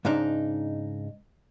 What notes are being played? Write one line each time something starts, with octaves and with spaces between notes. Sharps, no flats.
G#2 C#3 D4 D#4